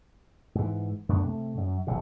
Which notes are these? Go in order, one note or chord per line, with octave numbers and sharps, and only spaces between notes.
G#2 E3
F#2 A3 B3 D4
C3 A3
F#2
E1 A#1 C3